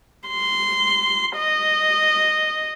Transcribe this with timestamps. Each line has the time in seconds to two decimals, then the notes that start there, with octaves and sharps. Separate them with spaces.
0.29 C6
1.36 D#5